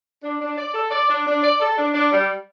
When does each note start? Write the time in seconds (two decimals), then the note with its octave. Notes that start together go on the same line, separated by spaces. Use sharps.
0.23 D4
0.40 D4
0.58 D5
0.74 A4
0.91 D5
1.09 D4
1.26 D4
1.43 D5
1.60 A4
1.77 D4
1.94 D4
2.12 G3